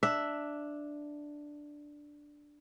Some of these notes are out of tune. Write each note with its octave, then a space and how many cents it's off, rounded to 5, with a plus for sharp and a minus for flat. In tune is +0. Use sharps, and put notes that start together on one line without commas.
D4 +5 E5 +0